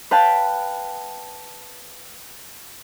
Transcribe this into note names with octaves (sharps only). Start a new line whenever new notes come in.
B4 F5 G5 A5 B5